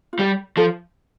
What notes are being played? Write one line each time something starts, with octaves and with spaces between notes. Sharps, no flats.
F4
G3 G4
F3 A4